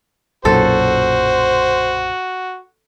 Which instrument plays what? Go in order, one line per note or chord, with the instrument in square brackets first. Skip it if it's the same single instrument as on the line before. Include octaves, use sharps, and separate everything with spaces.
[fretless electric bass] B1 F#2 A#2 [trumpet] F#4 [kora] A4 [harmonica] C5